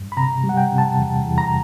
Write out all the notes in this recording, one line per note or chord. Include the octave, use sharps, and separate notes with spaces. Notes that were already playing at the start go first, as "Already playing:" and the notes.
Already playing: G2
B5
C3 A#5
G3
F#5
G5
C3
A5
E2
E2
A#5